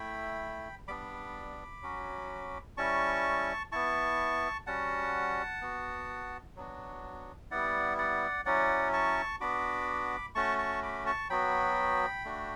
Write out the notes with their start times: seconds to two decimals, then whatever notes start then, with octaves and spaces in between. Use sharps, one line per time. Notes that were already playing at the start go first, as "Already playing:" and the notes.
Already playing: A3 E4 G5 B5
0.88 G3 B3 D4 B5 D6
1.82 F#3 C#4 F#4
2.77 G3 C#4 E4 A5 C#6
3.72 B3 E4 A5 C#6
4.67 G3 C#4 F#4 F#5 A5
5.61 B3 F#4
6.56 F#3 B3 D4 F#4
7.51 G3 B3 E4 D5 F#5
7.98 D5 F#5
8.46 F#3 C#4 E4 D5 F#5
8.93 A5 C#6
9.40 B3 D4 F#4 B5 D6
10.35 A3 C#4 F#4 A5 C#6
10.58 A5 C#6
10.83 B5 D6
11.06 A5 C#6
11.30 F#3 B3 F#4 G5 B5
12.25 A3 D4 F#4